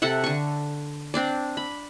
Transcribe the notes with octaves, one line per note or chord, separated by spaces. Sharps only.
C3 A4 E5 F#5
D3 C#6
C4 D4 D5
B5